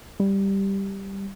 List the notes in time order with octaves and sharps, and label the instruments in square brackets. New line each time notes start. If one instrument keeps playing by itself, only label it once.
[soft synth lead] G3